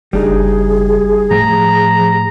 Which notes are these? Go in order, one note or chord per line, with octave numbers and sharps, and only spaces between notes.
F#1 G3 D4 D#4 G#4
A2 F3 A#5